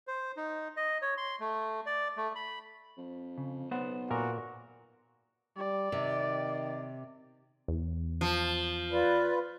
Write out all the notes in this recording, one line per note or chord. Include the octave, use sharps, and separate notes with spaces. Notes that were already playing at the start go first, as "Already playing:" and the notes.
C5
D#4
D#5
C#5
C6
A3
D5
A3
B5
F2
C#3
B1 B3 C5 F#5
A#2 F#4 A#4
G3 D5
C3 D#3
E2
F3
F4 B4 D5